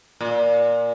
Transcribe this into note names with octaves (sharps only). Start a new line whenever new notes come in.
A#2